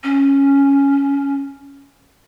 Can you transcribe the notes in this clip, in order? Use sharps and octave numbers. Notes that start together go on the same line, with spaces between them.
C#4